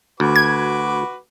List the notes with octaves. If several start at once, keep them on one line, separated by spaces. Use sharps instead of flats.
D2 F#4 B4 D6
G#6